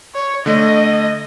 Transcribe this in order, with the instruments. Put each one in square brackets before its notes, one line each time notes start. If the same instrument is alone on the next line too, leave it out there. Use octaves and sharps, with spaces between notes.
[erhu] C#5
[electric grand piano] D3 A3 [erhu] D#5